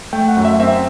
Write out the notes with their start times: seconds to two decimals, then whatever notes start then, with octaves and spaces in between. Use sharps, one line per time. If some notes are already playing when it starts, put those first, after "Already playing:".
0.13 A3 G5
0.28 F#5
0.37 F#2
0.45 E5
0.59 C4 E5